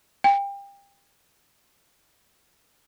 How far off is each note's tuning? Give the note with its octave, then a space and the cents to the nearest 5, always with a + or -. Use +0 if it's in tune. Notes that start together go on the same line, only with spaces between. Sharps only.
G5 +30